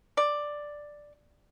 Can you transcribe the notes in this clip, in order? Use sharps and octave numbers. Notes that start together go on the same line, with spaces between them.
D5